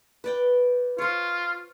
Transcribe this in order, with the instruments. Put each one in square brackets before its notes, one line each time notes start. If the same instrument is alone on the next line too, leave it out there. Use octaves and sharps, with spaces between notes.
[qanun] B4 D5 G5
[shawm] F4 [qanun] C5 C#5